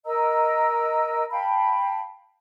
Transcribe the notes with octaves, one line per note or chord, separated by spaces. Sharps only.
A#4 D#5 A#5 E6
F5 G5 A5 B5